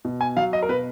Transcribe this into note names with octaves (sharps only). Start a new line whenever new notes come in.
B2
G#5
F#3 F5
D#5
A#4
B2 B4